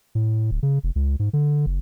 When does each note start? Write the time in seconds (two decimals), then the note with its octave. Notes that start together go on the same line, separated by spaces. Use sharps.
0.15 A2
0.51 D1
0.63 C#3
0.83 F1
0.96 C#2
1.19 G#2
1.33 D3
1.66 F#1